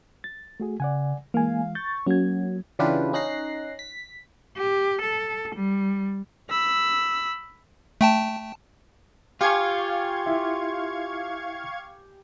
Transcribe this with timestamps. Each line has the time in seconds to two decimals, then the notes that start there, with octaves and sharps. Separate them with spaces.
0.24 A6
0.60 A3 F#4 G#4
0.80 C#3 D5 F#5 G#5
1.34 E3 G#3 A#3 F5 G#5
1.75 C#6 G6 A6
2.07 F#3 A#3 C#4 F#4 G#6
2.79 C#3 E3 D4 F4 G4 B4
3.13 C#4 D#4 F#6 A#6 C7
3.79 B6
4.57 G4
5.02 A4
5.56 G3
6.50 B5 E6
8.01 A3 G5 A5
9.41 F4 G4 F5 G#5 C#6 G#6
10.26 E4 E5